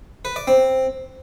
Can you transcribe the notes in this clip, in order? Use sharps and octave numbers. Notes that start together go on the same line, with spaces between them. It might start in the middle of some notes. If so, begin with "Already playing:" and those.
B4
D5
C4